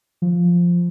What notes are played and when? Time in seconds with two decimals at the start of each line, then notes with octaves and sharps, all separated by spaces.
0.22 F3